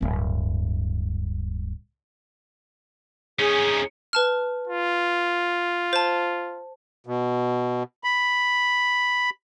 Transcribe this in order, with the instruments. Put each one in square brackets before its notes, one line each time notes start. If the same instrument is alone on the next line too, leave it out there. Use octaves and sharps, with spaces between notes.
[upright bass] D1 G2
[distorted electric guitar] C#4 D#4 [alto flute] G#4
[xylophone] B4 A5 F6
[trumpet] F4
[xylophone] C5 A5
[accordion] B2
B5